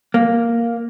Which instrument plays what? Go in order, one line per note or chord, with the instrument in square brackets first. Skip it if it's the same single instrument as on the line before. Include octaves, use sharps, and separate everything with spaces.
[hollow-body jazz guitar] A#3